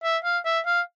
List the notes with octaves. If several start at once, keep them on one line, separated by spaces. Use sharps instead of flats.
E5
F5
E5
F5